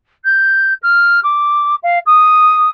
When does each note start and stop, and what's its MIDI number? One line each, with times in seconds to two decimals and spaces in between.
0.24 0.73 91
0.82 1.20 89
1.23 1.75 86
1.83 1.99 77
2.06 2.70 87